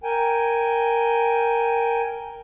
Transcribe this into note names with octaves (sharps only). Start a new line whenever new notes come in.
A#4 G5 G#5